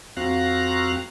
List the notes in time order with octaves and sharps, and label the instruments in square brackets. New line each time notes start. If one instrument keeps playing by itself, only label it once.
[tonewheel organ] F2 C4 F#4 F5 A#5 F#6